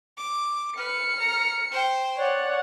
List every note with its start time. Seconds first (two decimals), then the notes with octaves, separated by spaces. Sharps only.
0.17 D6
0.77 B4 F6 C#7
1.19 A#5
1.71 C5 G5
2.17 C#5 D5 F#5